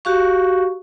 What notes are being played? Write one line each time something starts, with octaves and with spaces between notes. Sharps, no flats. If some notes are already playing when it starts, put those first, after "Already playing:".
F#4 G4 F5 C#6